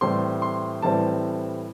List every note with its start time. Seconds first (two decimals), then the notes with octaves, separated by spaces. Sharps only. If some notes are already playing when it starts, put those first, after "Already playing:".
0.01 A2 E3 G3 C4 C6
0.42 C6
0.82 A2 E3 G3 C4 A5